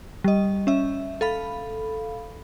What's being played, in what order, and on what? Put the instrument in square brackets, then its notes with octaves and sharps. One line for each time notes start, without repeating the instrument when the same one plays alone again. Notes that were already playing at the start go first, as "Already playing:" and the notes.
[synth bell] G3 D#5
C#4 E5
A4 F5 B5